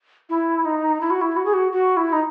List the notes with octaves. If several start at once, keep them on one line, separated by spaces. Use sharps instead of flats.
E4
D#4
E4
F#4
E4
F#4
G#4
F#4
F#4
E4
D#4